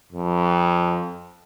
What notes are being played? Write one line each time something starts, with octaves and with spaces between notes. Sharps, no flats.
F2